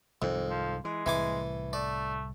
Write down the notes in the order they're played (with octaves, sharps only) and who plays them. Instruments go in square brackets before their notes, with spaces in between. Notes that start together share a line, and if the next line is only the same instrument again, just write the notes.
[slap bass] C2 G#2 D#3 [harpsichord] F2
[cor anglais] F3
[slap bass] E3 [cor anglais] G#3
[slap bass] C2 A2 [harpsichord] E3 G#5 D6
[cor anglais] A3 [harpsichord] D5